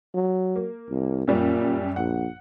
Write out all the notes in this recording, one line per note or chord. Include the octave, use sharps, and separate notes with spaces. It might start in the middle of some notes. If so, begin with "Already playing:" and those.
F#3
A#3
C2
F#2 A#2 G3
A#1 F#5